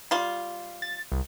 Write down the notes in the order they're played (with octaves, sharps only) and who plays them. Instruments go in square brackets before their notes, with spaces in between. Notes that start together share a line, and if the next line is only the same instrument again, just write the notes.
[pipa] G3 F4
[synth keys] A6
C2